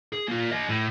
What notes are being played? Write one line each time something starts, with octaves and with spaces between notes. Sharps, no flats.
G#4
A#3 F4
G4 D#5
A2